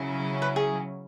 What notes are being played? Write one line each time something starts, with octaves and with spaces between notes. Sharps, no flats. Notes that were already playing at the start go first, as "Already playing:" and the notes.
Already playing: C#3 F#3 C#4 E4
B4
G#4